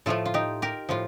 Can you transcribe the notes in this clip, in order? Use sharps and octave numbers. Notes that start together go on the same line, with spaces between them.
A2 F3 A3 F4 A4
F4
D#4 G4
G4 A#4
A2 F3 F4